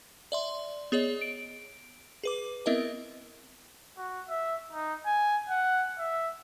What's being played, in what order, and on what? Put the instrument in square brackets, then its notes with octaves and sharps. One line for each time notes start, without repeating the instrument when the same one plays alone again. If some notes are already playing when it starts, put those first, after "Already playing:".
[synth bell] D5 E5 C6
B3 G#4 C#5 D#5
D7
G#4 B4 D6
B3 C4 E4 A#4 D#5 E5
[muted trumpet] F#4
E5
D#4
G#5
F#5
E5